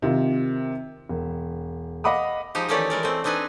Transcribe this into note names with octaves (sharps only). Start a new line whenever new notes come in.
C3 D#3 F4
E1
D#5 F5 F#5 B5 D6 D#6
F3 G#3 D#4 G4
D#3 E3 A3 C#4 G4 D5
G#3 A#4 D5
A3 C4
C4 D4 D#4 B4 G#5